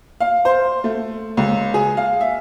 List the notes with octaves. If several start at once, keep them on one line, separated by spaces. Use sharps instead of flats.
F5
C5
A3
C#2
G#4
F5
E5